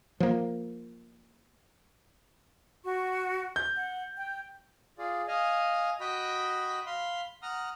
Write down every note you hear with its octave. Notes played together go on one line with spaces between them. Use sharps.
F3 A#3
F#4 C#6
G6
F#5
G5
F4 G#4 D5
D#5 F5 G#5
F#4 D#5 G5 B5
F5 B5 C6
F#5 A#5 D#6 F6